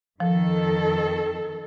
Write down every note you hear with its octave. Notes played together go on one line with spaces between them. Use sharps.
F2 D#3 F3 A4